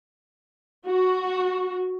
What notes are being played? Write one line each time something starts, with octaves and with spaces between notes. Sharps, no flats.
F#4